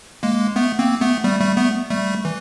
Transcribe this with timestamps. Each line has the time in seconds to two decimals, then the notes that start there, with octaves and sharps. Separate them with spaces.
0.23 G#3 A#3
0.56 A3 B3
0.79 A#3 C4
1.01 A3 B3
1.24 G3 A3
1.40 G3 A3
1.57 A3 B3
1.90 G3 A3
2.25 E3